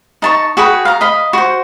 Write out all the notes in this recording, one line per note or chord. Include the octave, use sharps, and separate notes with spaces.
D#4 A5 C#6
F#4 G#4 B4 G5
F5 A#5
D#5 F5 B5
F#4 C5